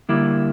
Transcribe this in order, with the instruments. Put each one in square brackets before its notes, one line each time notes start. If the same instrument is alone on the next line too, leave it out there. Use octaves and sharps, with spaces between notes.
[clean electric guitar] D3 G3 A#3 E4